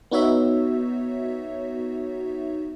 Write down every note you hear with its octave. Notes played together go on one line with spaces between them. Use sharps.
B3 D#4 F#4 C#5 E5